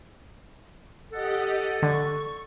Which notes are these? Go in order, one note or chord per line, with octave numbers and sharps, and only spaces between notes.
G4 A4 D#5 F#5
D3 C#6